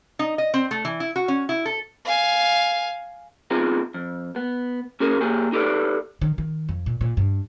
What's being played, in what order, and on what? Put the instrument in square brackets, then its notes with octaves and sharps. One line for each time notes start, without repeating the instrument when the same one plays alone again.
[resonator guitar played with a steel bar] D#4
D#5
C4
A3
E3
E4
F#4
C#4
E4
A4
[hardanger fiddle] F5 G#5
[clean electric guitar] B3 C4 D#4 F4 G#4
F2
B3
C#4 F#4 G#4 A#4
A#2 G4 G#4
D#4 G4 A4 B4 D5
[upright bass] D#3
D#3
F2
A#2
A#2
G2